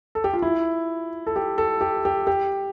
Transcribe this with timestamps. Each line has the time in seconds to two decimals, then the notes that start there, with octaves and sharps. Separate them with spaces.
0.15 A4
0.24 G4
0.33 F4
0.42 E4
1.27 A4
1.36 G4
1.58 A4
1.81 G4
2.05 G4
2.27 G4